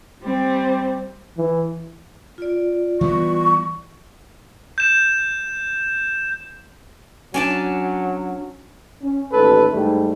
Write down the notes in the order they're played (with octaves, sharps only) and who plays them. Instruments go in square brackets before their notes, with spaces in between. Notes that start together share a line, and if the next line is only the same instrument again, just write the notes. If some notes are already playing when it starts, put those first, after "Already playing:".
[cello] G3 C4
[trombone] E3
[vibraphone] F4 D5
[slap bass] E3 G3 B3 [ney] C#6
[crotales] G6 E7
[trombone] F#3 [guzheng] C#4 D4 A5
[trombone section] C#4
A1 D#2 A4 B4
G#2 G3 A3 E4